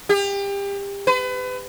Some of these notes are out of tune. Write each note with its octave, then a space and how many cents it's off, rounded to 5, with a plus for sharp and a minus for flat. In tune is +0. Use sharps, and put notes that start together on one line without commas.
G4 +30
B4 +35